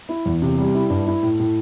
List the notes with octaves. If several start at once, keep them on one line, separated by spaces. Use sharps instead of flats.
E4
E2
C3
G3
E4
G2
E4
A2
A2